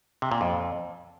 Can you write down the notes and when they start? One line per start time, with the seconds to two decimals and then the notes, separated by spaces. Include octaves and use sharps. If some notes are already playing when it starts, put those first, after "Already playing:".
0.22 C3
0.32 A#2
0.41 F2